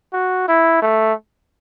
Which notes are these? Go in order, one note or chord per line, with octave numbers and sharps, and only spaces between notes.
F#4
E4
A3